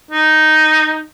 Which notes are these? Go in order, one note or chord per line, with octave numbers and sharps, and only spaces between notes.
D#4